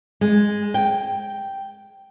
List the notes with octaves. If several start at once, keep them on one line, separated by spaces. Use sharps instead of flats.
G#3
G5